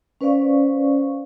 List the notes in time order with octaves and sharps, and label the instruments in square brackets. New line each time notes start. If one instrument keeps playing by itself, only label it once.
[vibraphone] C#4 B4 C5 D5 F5 C#6